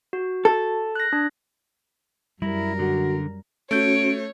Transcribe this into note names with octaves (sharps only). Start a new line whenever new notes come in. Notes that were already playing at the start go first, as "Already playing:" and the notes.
F#4
A4
F#6 A#6
D4
F#2 G3 E4 A#4
D3 F#4
A3 C#4 F#4 C#5 G6 D7